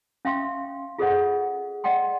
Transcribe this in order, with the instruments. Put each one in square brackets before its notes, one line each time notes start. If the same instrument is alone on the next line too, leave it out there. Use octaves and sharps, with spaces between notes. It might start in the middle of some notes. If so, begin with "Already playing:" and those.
[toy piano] C#4 E5 F5 G5 C6 C#6
F4 G#4 A4 C5 D#5 F#5
D5 D#5 F#5 G5 C6